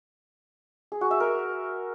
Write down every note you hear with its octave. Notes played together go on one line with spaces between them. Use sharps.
G#4
F#4
E5
A#4